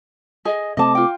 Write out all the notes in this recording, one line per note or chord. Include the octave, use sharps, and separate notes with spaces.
G#4 D#5
C3 A3 C4 D#5 A5 D6
F4 G5